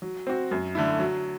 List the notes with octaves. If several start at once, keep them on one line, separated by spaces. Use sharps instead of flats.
F#3
C4 F#4
F#2
D3 A3 E4
F#3